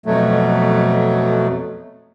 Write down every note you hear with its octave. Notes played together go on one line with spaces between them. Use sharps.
F2 B2 F#3 A3